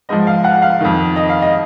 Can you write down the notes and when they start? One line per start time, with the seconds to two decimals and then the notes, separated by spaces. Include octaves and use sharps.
0.09 G#2 F3 D#5
0.27 F5
0.44 F#5
0.62 F5
0.81 F2 D#3
1.16 D#5
1.29 F5
1.42 D#5